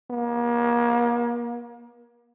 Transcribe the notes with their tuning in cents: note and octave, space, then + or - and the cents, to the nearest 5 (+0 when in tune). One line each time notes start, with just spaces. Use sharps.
A#3 +35